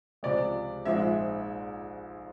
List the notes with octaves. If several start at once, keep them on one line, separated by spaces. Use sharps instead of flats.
C#2 C3 F3 G#3 D5
A#1 G#2 F3 G#3 E5